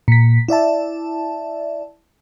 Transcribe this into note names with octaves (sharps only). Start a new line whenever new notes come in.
A#2 B6
E4 D5 E5 A5